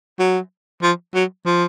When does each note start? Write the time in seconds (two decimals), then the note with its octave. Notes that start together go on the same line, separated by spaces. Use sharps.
0.19 F#3
0.82 F3
1.14 F#3
1.45 F3